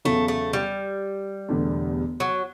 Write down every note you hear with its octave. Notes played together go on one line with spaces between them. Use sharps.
E2 C#3 F#3 A3
A3
G3
E1 E2 D3 A3
F#3